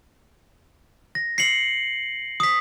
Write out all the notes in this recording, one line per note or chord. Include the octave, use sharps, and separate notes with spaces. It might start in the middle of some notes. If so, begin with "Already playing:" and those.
A#6
C7 C#7 F#7
D#6 B6